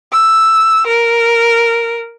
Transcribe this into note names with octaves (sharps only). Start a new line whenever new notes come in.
E6
A#4